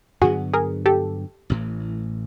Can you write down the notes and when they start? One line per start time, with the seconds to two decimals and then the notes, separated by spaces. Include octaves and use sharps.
0.21 G2 D3 F#3 B3 F#4 G#4
0.54 G#4 A#4
0.86 G4 A4
1.50 A1 A2 E3